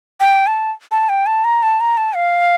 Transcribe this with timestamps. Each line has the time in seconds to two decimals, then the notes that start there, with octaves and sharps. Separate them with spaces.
0.20 G5
0.47 A5
0.92 A5
1.09 G5
1.26 A5
1.44 A#5
1.63 A5
1.80 A#5
1.97 A5
2.15 F5